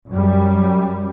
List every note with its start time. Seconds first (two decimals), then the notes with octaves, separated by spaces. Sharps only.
0.12 F#2 G3